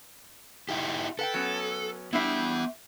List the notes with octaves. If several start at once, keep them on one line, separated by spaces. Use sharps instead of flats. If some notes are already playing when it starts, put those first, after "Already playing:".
D#4 E4 G4
A4 B4 F#5 G5
F#3 B3 C#4
G3 B3 D4 E4 E5